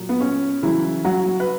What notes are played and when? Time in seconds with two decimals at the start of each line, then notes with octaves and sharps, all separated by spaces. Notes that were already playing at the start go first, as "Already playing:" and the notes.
Already playing: A#2 F#3
0.09 B3
0.20 C#4
0.62 C#3 E3 F#3 E4
1.04 F#3 F#4
1.40 B4